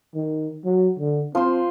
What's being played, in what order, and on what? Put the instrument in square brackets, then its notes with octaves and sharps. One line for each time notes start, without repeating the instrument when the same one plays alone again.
[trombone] D#3
F#3
D3
[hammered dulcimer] F3 C5 [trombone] C4